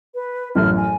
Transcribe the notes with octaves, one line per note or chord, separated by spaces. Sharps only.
B4
A1 F#2 A2 F6
G#5